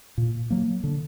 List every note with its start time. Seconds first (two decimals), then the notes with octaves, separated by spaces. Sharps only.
0.18 A#2
0.50 F#3 A#3
0.83 D3